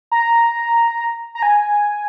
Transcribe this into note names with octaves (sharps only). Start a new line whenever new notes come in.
A#5
A#5
G#5